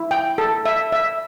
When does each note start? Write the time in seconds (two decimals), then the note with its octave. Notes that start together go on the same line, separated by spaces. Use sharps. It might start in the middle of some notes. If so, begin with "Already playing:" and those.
Already playing: E4
0.11 G5
0.38 A4
0.66 E5
0.92 E5